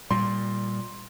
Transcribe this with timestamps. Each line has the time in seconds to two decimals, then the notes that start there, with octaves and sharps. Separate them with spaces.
0.11 A#2 G3 C6